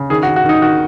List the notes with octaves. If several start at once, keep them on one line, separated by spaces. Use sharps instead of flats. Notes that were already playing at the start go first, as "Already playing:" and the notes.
Already playing: C#3
D#3 G#4
F#4
D#3
F#4
D#3 D#4
D#3 F#4